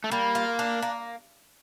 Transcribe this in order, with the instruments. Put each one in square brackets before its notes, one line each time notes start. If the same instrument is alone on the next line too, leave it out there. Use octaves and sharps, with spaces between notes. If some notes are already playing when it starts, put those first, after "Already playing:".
[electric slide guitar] A3
[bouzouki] G3 [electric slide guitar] A#3
[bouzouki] F4
D4
A#3